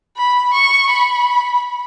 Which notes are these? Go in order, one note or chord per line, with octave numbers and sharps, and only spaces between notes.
B5
C#6
B5